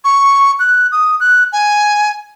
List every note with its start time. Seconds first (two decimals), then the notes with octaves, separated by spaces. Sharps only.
0.04 C#6
0.59 F#6
0.92 D#6
1.20 F#6
1.52 G#5